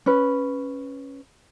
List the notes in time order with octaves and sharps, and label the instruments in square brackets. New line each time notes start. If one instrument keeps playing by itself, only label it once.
[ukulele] C#4 B4